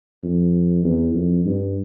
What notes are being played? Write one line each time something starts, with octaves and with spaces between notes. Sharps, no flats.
F2
E2
F2
G2